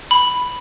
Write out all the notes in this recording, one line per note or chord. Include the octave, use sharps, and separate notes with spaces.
B5